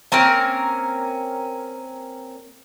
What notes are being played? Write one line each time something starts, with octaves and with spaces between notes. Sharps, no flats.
A#3 C4 C#4 A#4